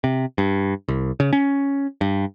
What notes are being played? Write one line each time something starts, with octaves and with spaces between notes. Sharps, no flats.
C3
G2
C2
C#3
C#4
G2